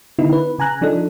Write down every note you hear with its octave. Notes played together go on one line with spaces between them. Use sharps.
D3 B3 D#4 E4
B4
C#3 G#5 A#5 F#6
F3 D4 D#4 A4